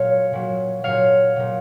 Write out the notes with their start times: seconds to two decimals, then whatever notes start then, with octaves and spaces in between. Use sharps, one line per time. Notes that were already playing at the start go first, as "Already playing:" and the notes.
Already playing: A#2 F#3 C#5 F5
0.33 A#2 F#3
0.84 A#2 F#3 C#5 F5
1.36 A#2 F#3